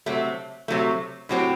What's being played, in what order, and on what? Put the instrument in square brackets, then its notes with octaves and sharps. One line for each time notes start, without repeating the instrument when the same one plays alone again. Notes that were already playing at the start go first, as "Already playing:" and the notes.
[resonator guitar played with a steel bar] C3 F#3 A3
C3 F#3 A3
A2 F#3 C4 G4